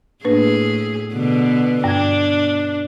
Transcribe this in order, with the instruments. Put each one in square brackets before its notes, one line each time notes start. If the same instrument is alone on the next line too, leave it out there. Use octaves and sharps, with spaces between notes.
[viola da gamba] A2 G#4 [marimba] A#3 D4 B4
[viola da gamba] B2 D3 B3
[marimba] G2 G#6 [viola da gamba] B2 D4